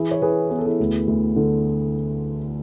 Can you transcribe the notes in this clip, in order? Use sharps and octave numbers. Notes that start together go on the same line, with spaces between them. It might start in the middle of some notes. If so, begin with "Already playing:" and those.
Already playing: E3 E4 G#4
C#5
E3 G#4 B4
B3 G#4
A4
E4 G#4
D2
D2
D3